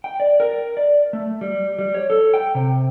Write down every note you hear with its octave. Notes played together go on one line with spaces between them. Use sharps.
G5
D5
A#4
D5
A3
G3
G3
C#5
A4
G5
C3